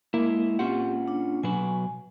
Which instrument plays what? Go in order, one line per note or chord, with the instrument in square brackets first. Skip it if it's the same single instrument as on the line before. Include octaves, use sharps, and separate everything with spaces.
[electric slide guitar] G#3 E4 [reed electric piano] A#3
[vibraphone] C4 G4 [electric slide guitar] C#4 F4 F#5
[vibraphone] D4
[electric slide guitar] B2 F#3 B4 [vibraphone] G#5